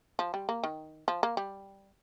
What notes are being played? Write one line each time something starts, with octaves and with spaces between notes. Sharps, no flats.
F3
G3
A#3
D#3
F3
A#3
G3